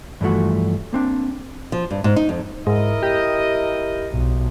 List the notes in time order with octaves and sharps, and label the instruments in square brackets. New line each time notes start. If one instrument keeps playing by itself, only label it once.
[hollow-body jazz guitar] G2 E3 F3 A3 F#4
A#3 C4 D4
[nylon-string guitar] F3
G2
G#2
D#4
F2
[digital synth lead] G#2 [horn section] E4 A#4 D#5
[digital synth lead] G4
[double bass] B1